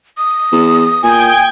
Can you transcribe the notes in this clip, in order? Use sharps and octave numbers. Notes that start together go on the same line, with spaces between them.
D#6
E2
A#2 G5 G#5 G6 G#6